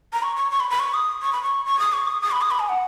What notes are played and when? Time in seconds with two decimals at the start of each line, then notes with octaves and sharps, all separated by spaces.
0.13 A#5
0.23 C#6
0.36 C#6
0.51 C#6
0.60 B5
0.70 B5
0.79 C#6
0.94 D#6
1.22 C#6
1.33 B5
1.43 C#6
1.65 C#6
1.79 D#6
1.93 C#6
2.07 D#6
2.22 D#6
2.31 B5
2.41 D#6
2.51 B5
2.59 G#5
2.69 F#5